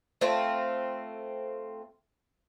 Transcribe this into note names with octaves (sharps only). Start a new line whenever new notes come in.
A3 C4 F4